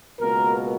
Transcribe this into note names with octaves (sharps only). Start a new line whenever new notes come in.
C#2 B2 A#3 A#4